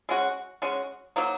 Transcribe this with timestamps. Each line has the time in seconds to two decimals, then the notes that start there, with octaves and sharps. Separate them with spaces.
0.09 G#3 C#4 F#4
0.62 G#3 C#4 F#4
1.16 F#3 A#3 D#4